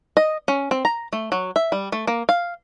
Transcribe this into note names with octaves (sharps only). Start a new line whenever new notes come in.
D#5
C#4
C4
A#5
A3
F#3
E5
G3
A3
A#3
F5